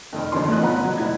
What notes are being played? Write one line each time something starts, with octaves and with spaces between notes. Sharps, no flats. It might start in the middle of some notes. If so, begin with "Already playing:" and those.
F1 F2 D#3
G1 F#2 D#3 E3 C6
A2 F3 D4 D#5 F#6
F#1 F3 B3 F#5 A#5 B5
F#3
F1 E4 D#5 G#6